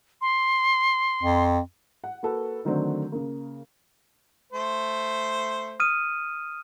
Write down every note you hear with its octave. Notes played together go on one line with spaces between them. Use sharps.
C6
F2
F#5
A#3 F#4 A4 B4
D3 D#3 F#3 A3 C4 D4
C#3 A#3
A3 C5
D#6 F6 D#7